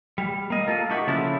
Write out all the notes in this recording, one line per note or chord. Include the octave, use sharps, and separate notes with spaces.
G3
A#3 D#5
A#3 F4 A4
A3 D#4 F#4 G4
C#3 F3 E4 A4